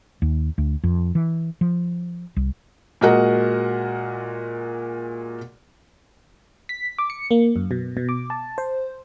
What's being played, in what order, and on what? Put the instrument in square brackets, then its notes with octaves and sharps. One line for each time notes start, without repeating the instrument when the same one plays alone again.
[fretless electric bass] D#2
D2
F2
E3
F3
C2
[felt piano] A#2 G#3 F#4 A#4 D#5 F#5
[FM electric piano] B6
D6
C#7
A#3
F#2
B2
B2
D6
A5
C5